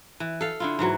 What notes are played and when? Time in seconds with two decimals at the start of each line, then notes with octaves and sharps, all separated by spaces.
0.20 E3
0.41 A4 F5
0.60 D3 E4 F4
0.79 G#2 E3 F#3